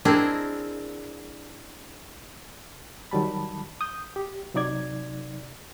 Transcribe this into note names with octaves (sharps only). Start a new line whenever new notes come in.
C4 D4 E4 G#4 A#4 D#5
D#3 F#3 G3 A5 B5
D#6 G6
G4
C3 F#3 D#4 D5 G#6